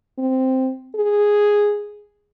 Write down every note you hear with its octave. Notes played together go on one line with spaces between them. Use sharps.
C4
G#4